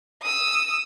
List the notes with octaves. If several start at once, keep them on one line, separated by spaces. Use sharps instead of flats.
D#6 E6